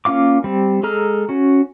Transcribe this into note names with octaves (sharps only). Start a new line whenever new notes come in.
A#3 C#4 F4 F5 D6
G3 C4
G#3 G#4 A4 A#5 F6
C#4 F#4